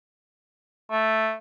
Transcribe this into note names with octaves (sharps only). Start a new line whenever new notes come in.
A3